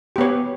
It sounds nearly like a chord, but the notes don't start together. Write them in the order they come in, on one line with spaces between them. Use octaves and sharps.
G4 B3 C#5